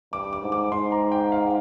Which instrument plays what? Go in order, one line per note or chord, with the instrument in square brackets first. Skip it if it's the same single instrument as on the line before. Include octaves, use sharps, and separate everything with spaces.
[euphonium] G2 [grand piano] D6
[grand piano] D6
[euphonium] G#2
[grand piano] D6
[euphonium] G#2 [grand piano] C6
[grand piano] A#5
G5
F5